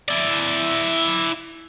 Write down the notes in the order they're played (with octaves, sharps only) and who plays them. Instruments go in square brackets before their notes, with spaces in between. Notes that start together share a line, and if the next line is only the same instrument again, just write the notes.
[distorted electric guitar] E4 D5